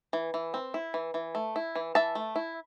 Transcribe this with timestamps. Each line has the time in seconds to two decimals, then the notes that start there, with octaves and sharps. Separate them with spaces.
0.13 E3
0.34 E3
0.54 C4
0.74 E4
0.94 E3
1.14 E3
1.35 A3
1.56 E4
1.75 E3
1.95 E3 E5 A5
2.15 A3
2.36 E4